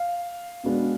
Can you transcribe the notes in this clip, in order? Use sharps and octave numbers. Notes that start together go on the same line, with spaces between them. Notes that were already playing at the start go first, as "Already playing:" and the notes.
Already playing: F5
B2 G#3 B3 D4